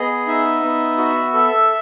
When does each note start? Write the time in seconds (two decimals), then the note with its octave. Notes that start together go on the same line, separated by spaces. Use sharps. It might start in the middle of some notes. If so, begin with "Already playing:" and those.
Already playing: B3 G#4 D#5
0.27 D#4 E5
0.63 B3
0.98 F#4
1.34 A4